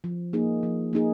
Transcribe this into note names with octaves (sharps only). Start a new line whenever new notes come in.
F3
A#3 D#4 G#4
F3
A#3 D#4 G#4